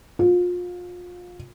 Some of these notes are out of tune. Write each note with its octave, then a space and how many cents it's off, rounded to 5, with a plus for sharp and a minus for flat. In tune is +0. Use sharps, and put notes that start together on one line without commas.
F4 +30